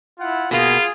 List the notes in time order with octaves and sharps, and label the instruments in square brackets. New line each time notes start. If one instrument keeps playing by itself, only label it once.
[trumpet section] E4 F4 F#5
[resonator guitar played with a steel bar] B2 A#3 [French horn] F4 [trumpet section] G#4